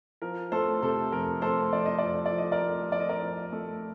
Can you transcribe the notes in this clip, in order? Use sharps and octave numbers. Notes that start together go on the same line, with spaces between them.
F3 A#4
A3 A4 C5
C3 A4
F2 A#4
A3 A4 C5
F3 D5
D#5
F2 D5
D#5
D5
F3
D#5
A#4 D5
A3
F3 D5
D#5
A#4 D5
F3
A3